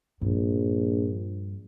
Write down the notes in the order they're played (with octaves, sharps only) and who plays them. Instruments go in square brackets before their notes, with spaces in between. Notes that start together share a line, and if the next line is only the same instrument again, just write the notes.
[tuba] A#1 [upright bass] G2